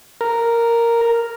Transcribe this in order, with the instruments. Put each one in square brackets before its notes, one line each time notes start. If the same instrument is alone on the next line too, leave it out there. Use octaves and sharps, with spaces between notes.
[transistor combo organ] A#4